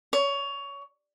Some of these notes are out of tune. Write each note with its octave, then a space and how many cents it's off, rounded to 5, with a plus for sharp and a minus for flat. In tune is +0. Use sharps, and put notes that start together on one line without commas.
C#5 +20